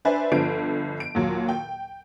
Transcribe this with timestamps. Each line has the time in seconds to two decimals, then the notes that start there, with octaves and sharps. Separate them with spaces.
0.05 D4 B4 C5 D5 E5 G#5
0.32 G1 D3 F3 D7
1.00 D7
1.15 D#2 A#2 F#3
1.48 G5